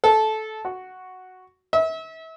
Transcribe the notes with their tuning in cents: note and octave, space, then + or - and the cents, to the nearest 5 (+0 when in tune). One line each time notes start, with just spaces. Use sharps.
A4 -15
F#4 +0
E5 -35